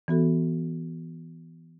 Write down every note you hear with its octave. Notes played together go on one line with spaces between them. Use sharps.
E3 B3 F#4 A4